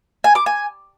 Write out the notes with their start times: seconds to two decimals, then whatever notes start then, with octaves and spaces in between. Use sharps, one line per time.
0.24 G#5
0.35 D6
0.46 G#5